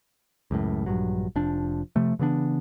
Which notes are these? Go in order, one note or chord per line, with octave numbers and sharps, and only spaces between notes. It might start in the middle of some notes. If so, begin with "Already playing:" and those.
C#2 F#2 A2
A#1 G2 F#3
F1 F3 D4
C3 F3 A3
C#3 E3 B3 D4